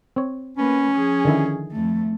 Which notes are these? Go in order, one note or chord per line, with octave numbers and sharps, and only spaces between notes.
C4 C#5
A#3 C#4 B4
F3 G#4
D3 D#3 E4
F2 A3